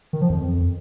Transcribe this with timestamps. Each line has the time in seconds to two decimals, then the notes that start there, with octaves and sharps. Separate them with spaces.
0.13 D#3
0.21 F3
0.30 F2